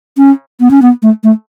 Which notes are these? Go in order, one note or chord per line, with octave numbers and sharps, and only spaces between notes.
C#4
B3
C#4
B3
A3
A3